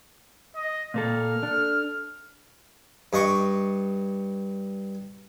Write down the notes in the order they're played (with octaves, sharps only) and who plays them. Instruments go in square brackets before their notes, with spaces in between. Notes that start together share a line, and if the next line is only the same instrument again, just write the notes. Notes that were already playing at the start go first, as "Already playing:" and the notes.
[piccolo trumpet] D#5
[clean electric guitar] A#2 A#3 A4 [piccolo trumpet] F6
[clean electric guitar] D4 A4
[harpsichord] G2 D#5 C#6 D6